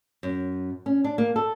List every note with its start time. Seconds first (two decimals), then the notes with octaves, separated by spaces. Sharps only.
0.23 F#2
0.86 C#4
1.04 D4
1.18 A#3
1.36 A4